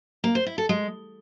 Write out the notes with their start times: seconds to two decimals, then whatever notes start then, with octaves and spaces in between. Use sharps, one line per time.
0.24 A#3
0.35 C5
0.46 E4
0.58 A4
0.69 G#3